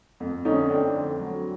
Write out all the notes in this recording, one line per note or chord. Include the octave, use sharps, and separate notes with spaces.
F2
D3 C#4 D#4
F2 C4 D4
D3
F#3